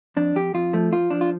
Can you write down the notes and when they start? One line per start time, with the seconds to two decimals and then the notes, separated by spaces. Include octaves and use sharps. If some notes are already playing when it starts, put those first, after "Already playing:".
0.17 F2 D4
0.36 F2 G4
0.54 F2 F4
0.73 F3 A3
0.92 F3 F4
1.10 F3 D4
1.21 F4